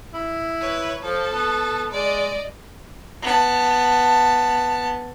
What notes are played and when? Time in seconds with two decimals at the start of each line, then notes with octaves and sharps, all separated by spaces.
0.14 E4
0.61 B4 C#5
1.01 F3 A4
1.33 B3
1.92 G#3 D5 D#5
3.22 B3 A5